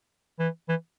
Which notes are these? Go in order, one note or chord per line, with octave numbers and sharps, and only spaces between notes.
E3
E3